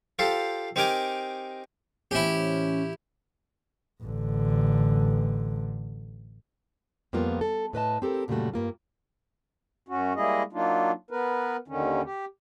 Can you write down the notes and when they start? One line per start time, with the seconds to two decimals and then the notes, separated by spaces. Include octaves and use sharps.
0.19 F4 G4 A4 C5
0.76 C4 D#4 G4 A#4 G#5 D6
2.11 A2 E3 C#4 E4 G4 C5
4.03 A1 D3
7.13 F2 G3 A#3 B3 F4 A#4
7.41 A4
7.73 A2 B4 D#5 A5
8.02 C4 G4 A4 A#4
8.28 F#2 A#2 C#3 G3 A3 F#4
8.54 G2 A#3 F4
9.88 F#2 C#4 F#4
10.15 G3 G#3 A#3 E4 G#4 D#5
10.53 F#3 A#3 D4 D#4 F4
11.10 B3 A#4 B4
11.68 D#2 D3 D#3 C#4
12.05 G4